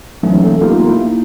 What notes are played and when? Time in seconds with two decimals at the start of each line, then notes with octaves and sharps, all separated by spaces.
0.23 E3 F#3 A3 A#3 C#4 D#4
0.44 A3 A#3 A4
0.61 A#3 B3 D#4 F4 G4 A#4
0.87 A#3 D#4 E4